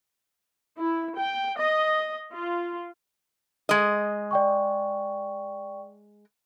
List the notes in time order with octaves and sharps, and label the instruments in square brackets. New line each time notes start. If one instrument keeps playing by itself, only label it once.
[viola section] E4
G5
D#5
F4
[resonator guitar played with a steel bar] G#3 D#5
[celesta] D5 G5 C#6